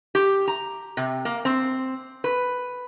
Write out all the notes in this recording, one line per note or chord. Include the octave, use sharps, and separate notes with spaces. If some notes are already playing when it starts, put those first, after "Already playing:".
G4
A#5
C3
A#3
C4
B4